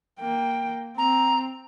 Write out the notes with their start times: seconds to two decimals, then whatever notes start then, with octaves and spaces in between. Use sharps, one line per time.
0.20 A#3 G5
0.98 C4 A#5